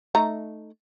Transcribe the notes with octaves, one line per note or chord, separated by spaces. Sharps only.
A3 D#4 A#5